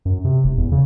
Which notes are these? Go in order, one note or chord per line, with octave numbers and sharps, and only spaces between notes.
F#2
C3
E1
E2
C#3